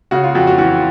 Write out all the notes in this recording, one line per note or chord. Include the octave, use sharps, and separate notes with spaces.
C#3 F#4
F4
F2 F#4
F#4
E3 F#4